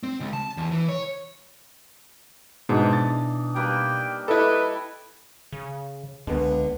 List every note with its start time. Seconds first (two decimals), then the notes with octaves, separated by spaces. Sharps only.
0.03 C4
0.20 C#2
0.33 A5
0.57 E2
0.71 E3
0.89 C#5
2.69 G#2 B2 E3 D4 D#4
2.93 A6
3.55 G3 A#3 B4 G5
4.28 E4 A4 B4 D#5 B5
5.53 C#3
6.27 C#2 D3 B3